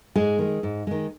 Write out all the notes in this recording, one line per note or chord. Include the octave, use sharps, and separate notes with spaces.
G#2 G#3 G#4
D#3 G#3
G#2
D#3 G#3